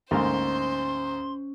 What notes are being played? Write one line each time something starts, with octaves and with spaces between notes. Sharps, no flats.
D2 G#2 A#3 C#4 C5 C6